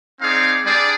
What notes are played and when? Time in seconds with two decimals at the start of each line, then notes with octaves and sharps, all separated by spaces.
0.19 C4 D#4 G#4 D5 F5
0.63 G3 D4 G#4 D5